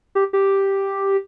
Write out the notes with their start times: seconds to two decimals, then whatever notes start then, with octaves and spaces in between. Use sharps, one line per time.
0.15 G4
0.33 G4